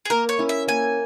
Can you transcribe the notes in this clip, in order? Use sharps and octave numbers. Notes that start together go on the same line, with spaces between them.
G#4
A#3 A#4
C#5
C#4 E4
E5
A#3 G#5